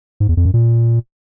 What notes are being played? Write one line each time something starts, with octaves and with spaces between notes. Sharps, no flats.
G#2
E2
F2
F#2
A#2